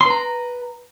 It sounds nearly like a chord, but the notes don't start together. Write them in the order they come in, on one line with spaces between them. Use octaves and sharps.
C6 B4 A#5